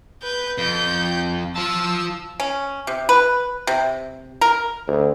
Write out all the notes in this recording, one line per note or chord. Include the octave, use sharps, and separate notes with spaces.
B4 G6
F2 G6
F4 A5 E6
C#4
C3
B4
C3
A#4
D2